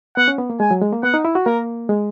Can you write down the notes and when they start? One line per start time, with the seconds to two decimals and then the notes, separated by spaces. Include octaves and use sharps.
0.17 B3 F#5
0.28 C#4
0.38 B3
0.50 A#3
0.60 G#3 G#5
0.71 F#3
0.81 G#3
0.92 A#3
1.03 B3 F#5
1.14 D#4
1.25 E4
1.35 F#4
1.46 A#3 A#4
1.89 G#3